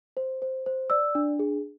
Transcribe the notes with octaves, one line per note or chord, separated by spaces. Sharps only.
C5
C5
C5
D5 E6
D4
G#4